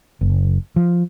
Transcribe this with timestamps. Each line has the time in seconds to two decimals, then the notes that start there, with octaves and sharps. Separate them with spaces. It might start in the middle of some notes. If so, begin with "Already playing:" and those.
0.21 F#1
0.76 F3